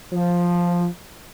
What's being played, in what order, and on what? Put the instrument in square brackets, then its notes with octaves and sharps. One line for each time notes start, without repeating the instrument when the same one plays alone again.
[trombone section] F3